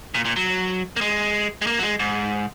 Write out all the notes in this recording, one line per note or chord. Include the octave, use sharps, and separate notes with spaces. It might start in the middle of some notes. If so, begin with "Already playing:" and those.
A#2
A#2
F#3
A#3
G#3
G#3
A#3
F#3
G#3
G#2